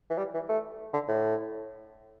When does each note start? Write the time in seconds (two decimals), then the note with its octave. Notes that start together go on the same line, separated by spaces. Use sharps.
0.10 E3
0.18 G3
0.34 E3
0.49 A3
0.93 D3
1.08 A2